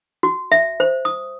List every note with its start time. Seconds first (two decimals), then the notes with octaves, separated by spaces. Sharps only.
0.23 F#4
0.52 E5
0.80 C5
1.05 D#6